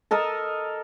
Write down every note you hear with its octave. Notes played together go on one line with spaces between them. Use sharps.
A4 A#4 D#5 A5